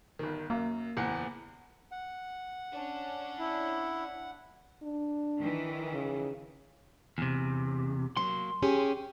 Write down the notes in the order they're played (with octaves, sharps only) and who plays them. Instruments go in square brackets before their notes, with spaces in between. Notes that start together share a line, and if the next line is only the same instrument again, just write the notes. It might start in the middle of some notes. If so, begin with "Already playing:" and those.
[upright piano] G1 D#3
[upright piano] F#2 [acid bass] A#3
[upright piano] F#1 E2 F#5
[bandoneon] F#5
[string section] C#4 D4
[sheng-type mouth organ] E4
[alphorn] D4
[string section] D#3 E3
[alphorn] C#3
[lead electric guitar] E2 C3
[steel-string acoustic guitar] F#3 A#3 [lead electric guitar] C6
[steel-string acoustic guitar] C#4 G4 G#4